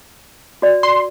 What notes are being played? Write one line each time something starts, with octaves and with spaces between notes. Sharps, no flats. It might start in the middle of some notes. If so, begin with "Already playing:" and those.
F#4 D5
C6